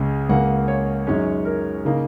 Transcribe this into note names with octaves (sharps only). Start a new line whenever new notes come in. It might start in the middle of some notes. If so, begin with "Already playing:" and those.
Already playing: C#2 C#3 G#3
C#2 C#3 A#3 F#5
C#5
F#2 D#3 G#3 C#4
A#4
C#3 A#3 D#4